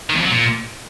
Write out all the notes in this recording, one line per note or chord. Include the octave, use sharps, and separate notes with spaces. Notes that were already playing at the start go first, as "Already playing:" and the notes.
D#3
E2
F2
F#3
A#2